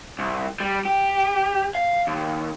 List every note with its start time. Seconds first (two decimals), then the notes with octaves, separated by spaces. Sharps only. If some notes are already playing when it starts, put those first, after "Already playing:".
0.19 C2
0.60 G3
0.85 G4
1.75 F5
2.07 D#2